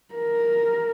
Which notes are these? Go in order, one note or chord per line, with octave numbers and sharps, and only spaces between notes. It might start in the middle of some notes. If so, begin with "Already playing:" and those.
A#4